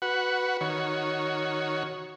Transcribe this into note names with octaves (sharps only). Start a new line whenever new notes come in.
F#4 B4 F#5
D#3 F#4 C#5